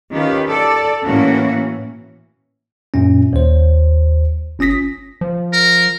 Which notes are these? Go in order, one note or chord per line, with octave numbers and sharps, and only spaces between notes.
D#3 C#4 F4 G4 B4
A4 D5
A2 E3 A#3 C#4 F#4
F#2 A#2 C#4
D#2 C5
G1 C#4 D#6 A#6 B6
F3
A#4